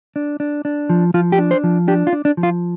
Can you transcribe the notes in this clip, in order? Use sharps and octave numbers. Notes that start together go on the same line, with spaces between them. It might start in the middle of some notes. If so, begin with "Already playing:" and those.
D4
D4
D4
F3
F3 F4
G4
D4
C5
F3
D4 G4
F4
D4
D4
F3
F4